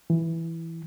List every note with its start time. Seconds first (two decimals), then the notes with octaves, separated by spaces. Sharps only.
0.10 E3